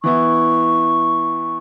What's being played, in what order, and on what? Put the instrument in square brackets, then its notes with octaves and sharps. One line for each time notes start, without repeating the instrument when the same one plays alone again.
[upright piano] E3 B3 E4 [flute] C#6